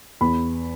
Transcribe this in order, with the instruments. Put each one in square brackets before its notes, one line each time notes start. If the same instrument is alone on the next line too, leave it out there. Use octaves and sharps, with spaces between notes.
[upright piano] E2 B5